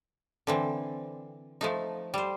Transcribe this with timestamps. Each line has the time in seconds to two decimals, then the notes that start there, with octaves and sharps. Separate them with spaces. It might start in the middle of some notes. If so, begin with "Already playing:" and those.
0.47 D3 E3 C4
1.61 F3 A3 D#4
2.14 G3 C5